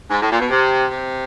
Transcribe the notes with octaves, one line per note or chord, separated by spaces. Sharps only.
G#2
A2
A#2
B2
C3
C3